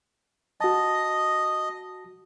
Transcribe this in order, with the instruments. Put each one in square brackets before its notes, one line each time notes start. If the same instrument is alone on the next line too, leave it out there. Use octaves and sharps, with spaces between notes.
[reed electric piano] F#4 A5 [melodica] D#5